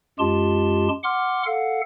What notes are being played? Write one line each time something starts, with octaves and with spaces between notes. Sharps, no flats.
F#2 G#3 F4 G4 A5 C6
F#5 C6 D6 F6
A4 F5 F#5